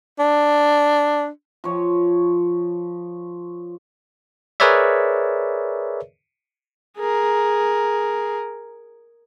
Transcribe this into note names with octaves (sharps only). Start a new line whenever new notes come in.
D4
F3 C#5
G#4 A#4 B4 C#5 D5 E5
G#4 A#4